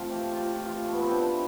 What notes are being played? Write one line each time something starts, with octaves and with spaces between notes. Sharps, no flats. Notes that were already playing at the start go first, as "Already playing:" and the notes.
Already playing: C3 A3 C4 F4
F3 G4
A2 F4
F4
F3 G4
F4
C3
A3
B3
F3 C4
D4
C3 E4